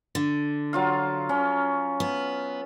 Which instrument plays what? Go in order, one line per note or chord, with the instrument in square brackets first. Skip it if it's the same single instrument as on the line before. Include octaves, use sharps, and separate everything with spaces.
[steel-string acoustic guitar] D3
[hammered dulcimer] F#3 F4 F5
C#4
[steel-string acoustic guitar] B3